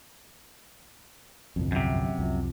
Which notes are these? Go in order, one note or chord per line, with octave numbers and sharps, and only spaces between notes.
G1 C2 F2
F#2 C3
C2 F2